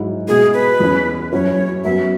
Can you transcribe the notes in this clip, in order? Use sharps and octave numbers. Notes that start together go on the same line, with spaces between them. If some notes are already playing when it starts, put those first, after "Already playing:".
Already playing: G#2 F#3 E4
B2 G#3 E4 G#4
B4
E2 E3 C#4
F#2 F#3 C#4 E4 C#5
F#2 F#3 B3 E5